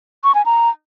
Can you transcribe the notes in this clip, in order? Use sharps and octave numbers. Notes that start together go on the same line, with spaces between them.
C#6
G#5
A#5